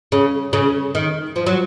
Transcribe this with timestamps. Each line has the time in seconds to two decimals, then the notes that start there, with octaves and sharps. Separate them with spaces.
0.12 C#3
0.53 C#3
0.95 D#3
1.36 F3
1.46 F#3